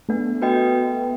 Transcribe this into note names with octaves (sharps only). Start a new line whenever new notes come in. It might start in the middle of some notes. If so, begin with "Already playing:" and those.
A3 B3 D4
F#4 B4 D#5 G5